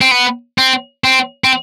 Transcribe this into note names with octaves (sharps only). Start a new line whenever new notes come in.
C4
B3
C4
C4
C4